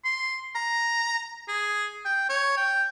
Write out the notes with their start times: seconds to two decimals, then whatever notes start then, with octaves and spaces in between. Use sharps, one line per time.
0.05 C6
0.55 A#5
1.48 G#4
2.05 G5
2.29 C#5
2.57 G5